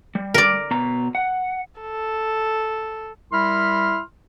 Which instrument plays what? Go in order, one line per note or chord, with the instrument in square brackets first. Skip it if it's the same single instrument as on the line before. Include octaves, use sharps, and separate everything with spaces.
[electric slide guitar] G3
[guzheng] A#4 D5
[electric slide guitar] B2 A#5
F#5
[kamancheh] A4
[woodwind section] G3 E4 A#4 B5 C6 F6